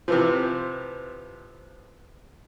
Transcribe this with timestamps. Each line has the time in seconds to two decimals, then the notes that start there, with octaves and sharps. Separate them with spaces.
0.08 C3 E3 F3